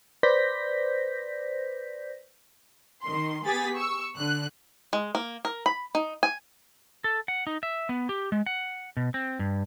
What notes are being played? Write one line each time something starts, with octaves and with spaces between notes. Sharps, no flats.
B4 C5 D5 G6 A#6 B6
D#3 C6
B3 G4 G#4 G#5 A6 B6
C#6 E6
D3 F#6
G#3
A#3
A#4
B5
D#4
G#5
A4
F#5
D#4
E5
B3
G4
G#3
F#5
B2
C4
G2